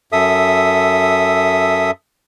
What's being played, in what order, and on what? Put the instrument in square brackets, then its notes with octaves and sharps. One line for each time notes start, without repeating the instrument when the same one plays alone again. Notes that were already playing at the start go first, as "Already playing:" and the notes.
[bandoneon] F#2 A4 E5 D#6